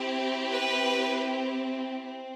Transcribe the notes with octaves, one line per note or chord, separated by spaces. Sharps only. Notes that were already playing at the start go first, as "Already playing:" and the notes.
Already playing: C4 E4 G4
B4
C4